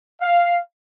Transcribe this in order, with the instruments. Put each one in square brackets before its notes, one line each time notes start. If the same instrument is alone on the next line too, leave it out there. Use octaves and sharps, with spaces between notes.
[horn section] F5